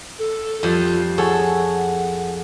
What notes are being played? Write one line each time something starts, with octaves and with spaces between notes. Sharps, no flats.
A4
F2 G3 F4
G#4 A4 C#5 F#5